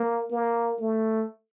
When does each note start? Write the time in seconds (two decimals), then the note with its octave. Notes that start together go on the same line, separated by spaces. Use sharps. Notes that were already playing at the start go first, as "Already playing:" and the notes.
Already playing: A#3
0.31 A#3
0.80 A3